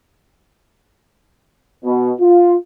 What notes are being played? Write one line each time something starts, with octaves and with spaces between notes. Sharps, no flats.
B2
F4